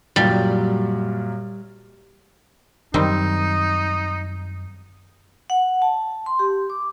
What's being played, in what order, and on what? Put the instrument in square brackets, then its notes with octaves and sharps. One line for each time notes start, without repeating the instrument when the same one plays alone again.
[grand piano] F#2 A#2 F#3 [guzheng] G3
[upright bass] F#2 [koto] D#3 G3 C4 [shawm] D#4
[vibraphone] F#5
A5
C6
G4
D6